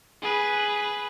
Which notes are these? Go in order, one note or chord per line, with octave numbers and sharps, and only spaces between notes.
G#4 B4